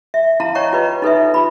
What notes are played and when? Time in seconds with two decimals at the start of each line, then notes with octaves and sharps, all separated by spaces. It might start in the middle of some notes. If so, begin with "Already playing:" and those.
0.14 E5
0.40 E4 F5 A5 A#5
0.55 C#5 D#5 G5 A#5 C#6
0.73 F4 B4 D#5
1.02 D#4 A4 B4 E5
1.34 F4 B5